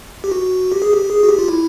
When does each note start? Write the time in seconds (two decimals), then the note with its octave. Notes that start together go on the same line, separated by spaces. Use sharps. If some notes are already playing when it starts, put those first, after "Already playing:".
0.24 G4
0.32 F#4
0.72 G4
0.82 G#4
0.93 G4
1.10 G#4
1.23 F#4
1.29 G4
1.39 F4
1.48 E4